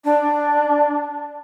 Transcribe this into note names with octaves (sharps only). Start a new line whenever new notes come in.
D4